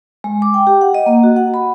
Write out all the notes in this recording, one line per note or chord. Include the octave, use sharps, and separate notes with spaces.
G#3
D6
G5
G4
F#5
D#5
A#3
F#4
F#5
B5